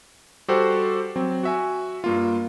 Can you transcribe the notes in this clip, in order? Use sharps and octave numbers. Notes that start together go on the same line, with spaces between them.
G3 F#4 G4 A4 C5 F#5
F#3 C4
F#4 E5 G#5
G2 A#3 F4